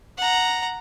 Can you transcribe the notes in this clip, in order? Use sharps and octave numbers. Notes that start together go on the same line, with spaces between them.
F#5 A#5